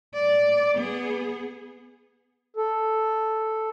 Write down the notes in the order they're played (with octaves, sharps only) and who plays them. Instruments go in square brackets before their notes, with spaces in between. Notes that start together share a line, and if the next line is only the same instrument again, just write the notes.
[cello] D5
B3 G#4
[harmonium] A4